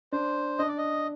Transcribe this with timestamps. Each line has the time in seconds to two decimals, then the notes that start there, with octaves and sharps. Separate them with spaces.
0.12 D4 C5
0.59 D4 D#5
0.68 D5
0.78 D#5